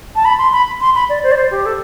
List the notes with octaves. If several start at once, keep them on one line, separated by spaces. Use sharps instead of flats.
A5
B5
C6
B5
C6
B5
D5
C5
D5
C5
G4
A4